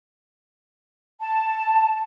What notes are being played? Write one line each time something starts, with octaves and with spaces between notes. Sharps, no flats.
A5